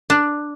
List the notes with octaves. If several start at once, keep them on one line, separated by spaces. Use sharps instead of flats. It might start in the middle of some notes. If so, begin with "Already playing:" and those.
D4